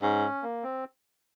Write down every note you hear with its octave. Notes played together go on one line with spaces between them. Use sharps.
G#2 C#4
A#3
C4